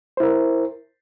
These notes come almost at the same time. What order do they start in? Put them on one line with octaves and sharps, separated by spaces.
C5 E4 A#4